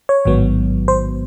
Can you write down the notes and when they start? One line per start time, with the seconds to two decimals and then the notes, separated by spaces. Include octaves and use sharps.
0.09 C#5
0.25 A1 G#2 D#3 F#3 B3
0.88 C5